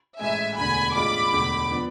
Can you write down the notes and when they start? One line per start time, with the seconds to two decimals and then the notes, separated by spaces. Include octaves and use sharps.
0.19 A1 G#2 G#3 E5 G#5
0.57 E1 D2 D3 G#5 B5
0.95 A1 G#2 G#3 D4 F4 B5 D6
1.33 E1 D2 D3
1.71 F3 B3 D4